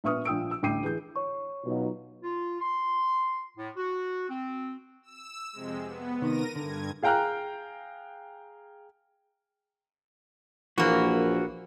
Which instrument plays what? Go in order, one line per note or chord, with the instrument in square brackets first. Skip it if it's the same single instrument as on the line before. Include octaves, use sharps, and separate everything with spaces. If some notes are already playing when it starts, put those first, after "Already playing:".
[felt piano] A#1 B3 E5 C#6 D#6 F6
A#1 F3 G5 D#6 E6 D7
E6
A1 D2 G5 D6 C7 D#7
E3 G#4 G6
[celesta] C#5 C#6
[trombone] B2 [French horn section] F#3 D#4 F4
[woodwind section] F4
C6
A2
F#4
C4
[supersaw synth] E6
F2 C3 G#3
B3
[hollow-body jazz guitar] C3 D#3 B3 [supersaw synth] A#4 A#6 D#7
[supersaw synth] G2 G#6 [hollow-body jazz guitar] D3
[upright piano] G#4 F5 G5 A#5 F6 F#6
[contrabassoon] A#1 [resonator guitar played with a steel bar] E3 A#3 [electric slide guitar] F#4